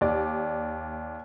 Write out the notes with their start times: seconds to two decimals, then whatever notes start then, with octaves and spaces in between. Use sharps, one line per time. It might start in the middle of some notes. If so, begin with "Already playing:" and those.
0.01 D#2 D5